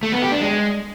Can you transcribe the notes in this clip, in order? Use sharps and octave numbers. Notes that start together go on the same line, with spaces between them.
A3
B3
G4
D4
G#3